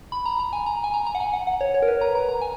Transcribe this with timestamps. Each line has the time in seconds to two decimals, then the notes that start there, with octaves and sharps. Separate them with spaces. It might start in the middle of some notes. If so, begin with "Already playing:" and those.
0.12 B5
0.25 A#5
0.39 A#5
0.53 G#5
0.66 A#5
0.84 G#5
0.94 A#5
1.06 A#5
1.15 F#5
1.20 G#5
1.33 F#5
1.47 F#5
1.61 C#5
1.74 C#5
1.82 A#4
1.88 B4
2.01 A#5
2.15 A#5
2.29 A#5
2.41 G#5